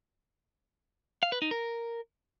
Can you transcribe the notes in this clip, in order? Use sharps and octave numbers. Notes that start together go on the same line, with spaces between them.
F5
B4
D#4
A#4